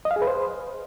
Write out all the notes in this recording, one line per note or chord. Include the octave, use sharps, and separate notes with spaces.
D#5
F5
G#4
B4
C5